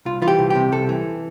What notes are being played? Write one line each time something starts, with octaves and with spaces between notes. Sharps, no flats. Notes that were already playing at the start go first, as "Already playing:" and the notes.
C2 F4
E3 F4
G4
C2
C3 G4
C2 A4
E3